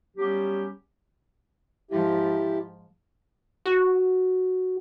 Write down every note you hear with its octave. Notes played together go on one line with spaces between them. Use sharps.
F#3 G3 B3 C#4 G4
G#2 F3 E4 G4
F#4